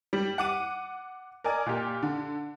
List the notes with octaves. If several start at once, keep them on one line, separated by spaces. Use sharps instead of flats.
G3
F#5 D6 D#7
A#4 D5 D#5 G#5
A#2 G4
D3